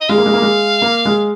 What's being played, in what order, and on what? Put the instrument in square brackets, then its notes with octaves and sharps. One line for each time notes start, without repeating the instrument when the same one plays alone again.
[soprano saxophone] D#5
[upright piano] G#3 [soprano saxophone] F5
[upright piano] A#3
G#3
A#3
G#3
A#3
G#3